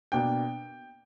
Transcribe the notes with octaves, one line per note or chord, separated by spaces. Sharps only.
B2 A#3 D4 G5